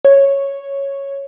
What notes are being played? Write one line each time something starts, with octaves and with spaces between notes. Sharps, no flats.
C#5